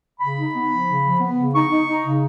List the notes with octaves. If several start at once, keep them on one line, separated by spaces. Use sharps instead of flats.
C#3 B5
D#4
B3
F3
C#3
F3
B3
C#3
D#4 C#6
D#4
D#4
C#3